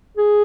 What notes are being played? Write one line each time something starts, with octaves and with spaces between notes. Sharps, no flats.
G#4